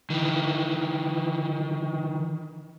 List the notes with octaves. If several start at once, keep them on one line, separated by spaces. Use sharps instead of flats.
D#3 E3